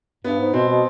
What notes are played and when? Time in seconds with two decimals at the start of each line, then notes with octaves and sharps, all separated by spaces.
0.24 G2 B3
0.39 G#2
0.53 B2 C4
0.68 B2